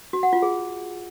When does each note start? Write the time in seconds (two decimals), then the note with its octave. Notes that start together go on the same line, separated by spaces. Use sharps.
0.13 F#4
0.23 F#5
0.33 F4
0.42 G#4